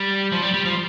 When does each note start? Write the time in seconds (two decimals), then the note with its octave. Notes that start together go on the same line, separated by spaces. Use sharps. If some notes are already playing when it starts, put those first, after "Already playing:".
Already playing: G3
0.32 F3
0.42 G3
0.54 G3
0.65 F3